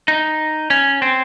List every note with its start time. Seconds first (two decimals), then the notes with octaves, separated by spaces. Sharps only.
0.08 D#4
0.70 C#4
1.02 C4